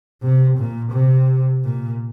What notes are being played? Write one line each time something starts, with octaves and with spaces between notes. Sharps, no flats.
C3
A#2
C3
A#2